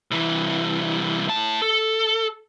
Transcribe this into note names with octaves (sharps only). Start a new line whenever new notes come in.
C2 E3
A2 A5
A4